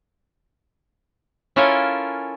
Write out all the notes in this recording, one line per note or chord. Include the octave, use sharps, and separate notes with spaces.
C#4 E4 F4 A4 A#4 G#5